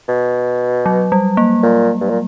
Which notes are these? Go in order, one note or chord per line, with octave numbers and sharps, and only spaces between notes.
B2
F#3
G3
A#3
A#2
G2
A#2